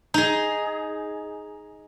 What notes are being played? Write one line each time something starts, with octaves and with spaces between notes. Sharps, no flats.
D#4 G#4